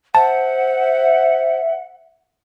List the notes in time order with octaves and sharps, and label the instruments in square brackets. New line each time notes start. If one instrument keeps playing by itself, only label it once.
[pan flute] C5 [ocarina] E5 [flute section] F#5 [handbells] A5